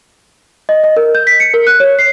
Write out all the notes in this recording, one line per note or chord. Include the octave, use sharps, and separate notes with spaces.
D#5
D#5
A#4
G6
B6
C#7
A#4
F#6
C#5
C7